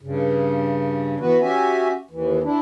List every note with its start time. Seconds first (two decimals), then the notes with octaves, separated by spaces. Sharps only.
0.01 G2 C#3
1.20 E3 B3 F#4 B4
1.42 C#4 F#4 G4 E5 G#5
2.11 D#2 E3
2.44 D4 E4